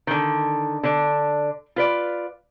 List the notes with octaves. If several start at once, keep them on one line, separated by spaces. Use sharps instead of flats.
D3 D#3
D3 D4
F4 B4 D5